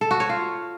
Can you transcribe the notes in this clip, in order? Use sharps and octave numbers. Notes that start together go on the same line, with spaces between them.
A4
F#4
C#5
F4